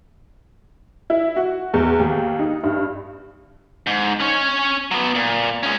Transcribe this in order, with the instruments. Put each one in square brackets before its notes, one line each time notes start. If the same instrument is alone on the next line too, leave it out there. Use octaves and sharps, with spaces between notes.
[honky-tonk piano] E4
F#4
E2
D#2
D#4
G2
[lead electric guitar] G#2
C#4 C#5
F#3 B3
A#2
G#3 C#4